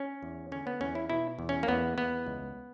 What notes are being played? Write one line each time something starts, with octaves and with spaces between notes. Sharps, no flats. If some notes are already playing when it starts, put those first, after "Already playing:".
Already playing: C#4
E2
D3 C#4
B3
E2 C#4
E4
B2 E4
E2
C#4
A#3
E2 B3
E2 B3
C#2